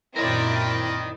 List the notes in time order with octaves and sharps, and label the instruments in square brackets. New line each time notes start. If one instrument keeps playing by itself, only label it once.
[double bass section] F#2 A#2 [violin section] C4 E4 D5 [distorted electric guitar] A#4 D#5